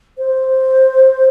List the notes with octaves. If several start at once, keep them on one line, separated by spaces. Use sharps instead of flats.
C5